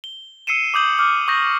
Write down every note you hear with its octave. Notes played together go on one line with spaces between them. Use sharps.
G7
E6 C7 C#7 D#7 E7
D6 D#6 G6 F#7
D6 F6
C#6 D#6 G6 A#6